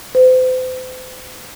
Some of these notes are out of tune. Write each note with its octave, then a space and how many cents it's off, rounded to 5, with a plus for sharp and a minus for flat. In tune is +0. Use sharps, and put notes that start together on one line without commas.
C5 -40